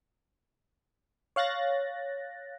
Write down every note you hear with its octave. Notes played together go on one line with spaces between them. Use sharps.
C#5 F5 F#6 A6 A#6